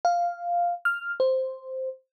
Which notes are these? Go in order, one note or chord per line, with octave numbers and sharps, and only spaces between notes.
F5
F6
C5